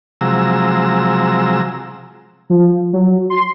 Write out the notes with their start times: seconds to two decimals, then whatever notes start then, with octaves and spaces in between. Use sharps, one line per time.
0.21 C3 F3 F#3 G#3 A#5 E6
2.50 F3
2.93 F#3
3.30 C6